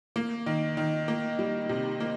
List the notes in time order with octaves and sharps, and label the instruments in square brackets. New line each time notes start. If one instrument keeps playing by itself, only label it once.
[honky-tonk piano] A#3
D#3
D#3
A#3
G3
C3
A#3